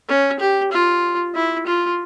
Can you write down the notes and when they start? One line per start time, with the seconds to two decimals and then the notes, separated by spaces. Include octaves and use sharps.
0.09 C#4
0.40 G4
0.73 F4
1.35 E4
1.67 F4